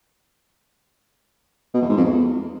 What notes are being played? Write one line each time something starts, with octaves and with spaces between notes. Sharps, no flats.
B2
E2
G#2
F2
E2